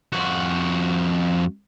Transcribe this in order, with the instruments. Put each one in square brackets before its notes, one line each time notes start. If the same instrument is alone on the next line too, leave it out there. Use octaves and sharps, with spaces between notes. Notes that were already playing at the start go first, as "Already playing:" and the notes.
[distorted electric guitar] F2 F#4